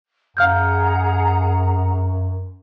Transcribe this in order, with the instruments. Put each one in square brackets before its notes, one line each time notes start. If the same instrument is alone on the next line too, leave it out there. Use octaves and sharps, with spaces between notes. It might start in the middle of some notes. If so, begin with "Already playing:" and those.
[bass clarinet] F#2 [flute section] G#4 F#5 A#5 [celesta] F5 F6 G6